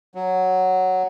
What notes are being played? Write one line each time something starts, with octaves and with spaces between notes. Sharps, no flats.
F#3